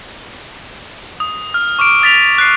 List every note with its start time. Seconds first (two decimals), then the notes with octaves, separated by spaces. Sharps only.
1.20 D#6
1.54 F6
1.79 C#6 D6 F6 D7
2.02 D#6 A6 B6 F7
2.38 F#6 C7